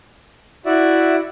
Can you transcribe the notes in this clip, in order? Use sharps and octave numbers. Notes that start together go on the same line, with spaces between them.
E4 F#4 D5 E5